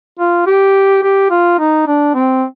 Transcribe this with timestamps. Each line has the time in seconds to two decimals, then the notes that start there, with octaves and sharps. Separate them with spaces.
0.19 F4
0.47 G4
1.03 G4
1.30 F4
1.59 D#4
1.87 D4
2.15 C4